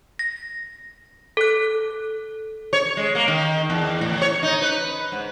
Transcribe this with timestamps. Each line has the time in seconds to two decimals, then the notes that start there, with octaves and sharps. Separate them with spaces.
0.19 A#6
1.37 A4 F#6
2.73 C#5
2.97 G#3
3.15 A#3
3.28 D#3
3.70 E2
4.01 A2
4.22 C#5
4.43 D#4
4.62 B4
5.12 G#2